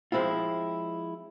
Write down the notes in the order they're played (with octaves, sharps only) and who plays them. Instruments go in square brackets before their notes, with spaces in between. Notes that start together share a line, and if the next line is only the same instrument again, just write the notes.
[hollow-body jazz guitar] F3 G#3 C4 E4 F4